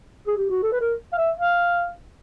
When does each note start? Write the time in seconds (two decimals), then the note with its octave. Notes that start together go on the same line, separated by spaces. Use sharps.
0.27 G#4
0.37 G4
0.50 F#4
0.63 A4
0.72 B4
0.81 A#4
1.13 F5
1.18 E5
1.37 F5